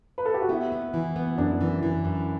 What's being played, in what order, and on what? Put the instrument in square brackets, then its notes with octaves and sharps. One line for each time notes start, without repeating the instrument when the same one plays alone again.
[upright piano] B4
A4
G4
F#4
[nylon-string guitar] B3 [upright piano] E4
[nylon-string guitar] B3
E3
B3
[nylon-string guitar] F#2 [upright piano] D4
[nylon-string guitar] E3
E3
F#2